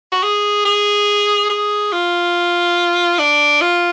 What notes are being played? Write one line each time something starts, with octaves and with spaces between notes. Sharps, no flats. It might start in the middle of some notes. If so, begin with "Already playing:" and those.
F#4
G#4
G#4
G#4
F4
D4
F4